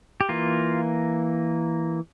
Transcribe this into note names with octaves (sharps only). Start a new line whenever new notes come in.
G4
E3 A#3 F4